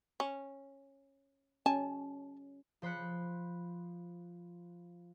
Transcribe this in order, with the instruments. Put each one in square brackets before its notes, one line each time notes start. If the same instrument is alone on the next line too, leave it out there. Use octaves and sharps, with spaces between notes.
[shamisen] C#4
[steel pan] C#4 [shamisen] G#5 A5
[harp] F3 C5 B5 F#6 C#7